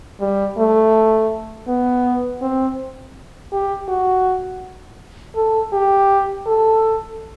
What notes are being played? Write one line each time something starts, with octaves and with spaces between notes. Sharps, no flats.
G3
A3
B3
C4
G4
F#4
A4
G4
A4